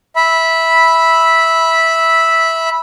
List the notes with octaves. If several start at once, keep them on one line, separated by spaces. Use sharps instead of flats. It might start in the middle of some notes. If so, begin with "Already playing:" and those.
E5 B5